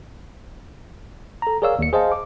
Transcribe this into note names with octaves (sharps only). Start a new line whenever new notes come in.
A4 A#5
G#4 A#4 C#5 D5 F5 E6
D#2 C#7
G#4 C5 D#5 F5 A5
D6